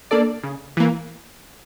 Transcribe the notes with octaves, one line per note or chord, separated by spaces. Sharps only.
A#3 D4 A4 D5
C#3
E3 A#3